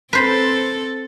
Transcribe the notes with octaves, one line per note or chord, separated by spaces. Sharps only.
C4 A4 B4 C5 B5